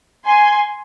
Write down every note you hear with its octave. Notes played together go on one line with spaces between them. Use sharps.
G#5 C6